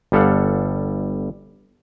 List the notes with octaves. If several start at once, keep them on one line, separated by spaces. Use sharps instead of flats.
G1 G3 A4 F5 F#5